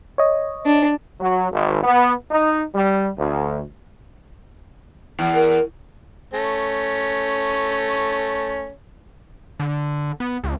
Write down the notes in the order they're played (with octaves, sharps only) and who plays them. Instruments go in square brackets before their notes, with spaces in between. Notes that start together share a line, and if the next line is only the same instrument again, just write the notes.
[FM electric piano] C#5 D#5
[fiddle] D4
[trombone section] F#3
G#1
B3
D#4
G3
D2
[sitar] E2
[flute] A#4
[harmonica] A3 C#4
[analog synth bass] D3
B3
C#2